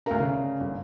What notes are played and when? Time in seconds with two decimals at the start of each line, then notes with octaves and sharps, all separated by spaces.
0.06 D2 D4 A#4 F5 A#5
0.20 C#3
0.60 G1